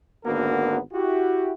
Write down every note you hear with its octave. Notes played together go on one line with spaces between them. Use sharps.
G#1 D3 A#3 B3 F#4 A#4
E4 F#4 G4